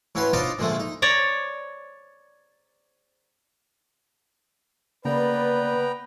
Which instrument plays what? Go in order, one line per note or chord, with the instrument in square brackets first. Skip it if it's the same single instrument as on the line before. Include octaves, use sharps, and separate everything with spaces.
[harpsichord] A2 C#4 F#4 B4 C6
D4 D#4 F4 C5 D5 D#5
A#2 D3 F3 G#3 A3
D#4
[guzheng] C#5 D5 A#5
[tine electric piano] C#3 A#3 [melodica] B3 G5 A#5 [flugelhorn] B4 [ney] D5